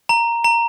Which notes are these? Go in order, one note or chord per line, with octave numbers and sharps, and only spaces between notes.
A#5
A#5